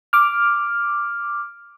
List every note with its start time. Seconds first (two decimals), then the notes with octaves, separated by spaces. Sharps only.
0.13 D6 F6